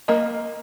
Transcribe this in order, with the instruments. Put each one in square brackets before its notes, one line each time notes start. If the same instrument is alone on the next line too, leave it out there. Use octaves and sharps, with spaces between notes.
[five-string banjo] A#3 [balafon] D#5